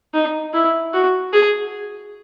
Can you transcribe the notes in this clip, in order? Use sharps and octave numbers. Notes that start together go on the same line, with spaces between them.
D#4
E4
F#4
G#4